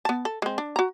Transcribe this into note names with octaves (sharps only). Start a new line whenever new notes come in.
B3 A5
A4
G#3 C4
D4
F#4 A#5